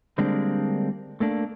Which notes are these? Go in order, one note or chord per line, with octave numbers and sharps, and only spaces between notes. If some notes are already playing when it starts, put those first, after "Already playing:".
D3 G3 G#3 A#3 C4 D4
A3 A#3 D4